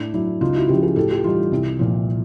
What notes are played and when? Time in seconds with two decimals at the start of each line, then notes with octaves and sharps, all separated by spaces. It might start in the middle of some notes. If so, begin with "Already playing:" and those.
Already playing: A2 D4 E4
0.14 F#3 D4 E4
0.41 C#2 D#4 F4
0.55 E4 F#4
0.68 C#3 F3 F4 G4
0.83 F#4 G#4
0.96 A2 G4 A4
1.10 F4 G4
1.24 E3 G3 D#4 F4
1.52 C2
1.79 A#2 F3